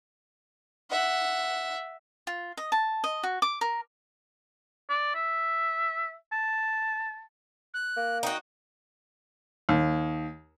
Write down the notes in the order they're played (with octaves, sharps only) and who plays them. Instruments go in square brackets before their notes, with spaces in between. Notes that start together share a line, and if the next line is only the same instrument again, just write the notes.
[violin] E5 F#5
[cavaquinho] F4
D#5
A5
D#5
F#4
D6
A#4
[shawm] D5
E5
A5
[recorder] F#6
[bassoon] A#3
[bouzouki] D#4 F#4 [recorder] G5
[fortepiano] D#2